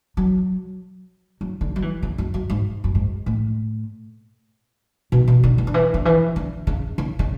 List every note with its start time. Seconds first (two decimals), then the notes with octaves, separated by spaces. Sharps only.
0.17 F#3
1.41 F#3
1.61 D3
1.76 F#3
1.82 E3
2.02 C#3
2.18 F#2
2.34 F#2
2.50 G#2
2.84 F#2
2.95 G#2
3.26 A2
5.12 B2
5.27 B2
5.43 D3
5.58 E3
5.67 D3
5.74 E3
5.94 D3
6.05 E3
6.36 D3
6.67 C#3
6.98 C#3
7.19 C#3